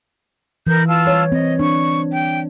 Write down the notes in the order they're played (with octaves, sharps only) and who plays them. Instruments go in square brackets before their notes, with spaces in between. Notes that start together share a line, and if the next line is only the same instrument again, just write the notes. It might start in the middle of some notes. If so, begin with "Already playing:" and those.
[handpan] E3 [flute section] A#4 B4 G6
[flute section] F4 A5 E6
[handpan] G3 C#5
[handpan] C4 [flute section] D#5
[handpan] D4 [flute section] C#6
[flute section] G5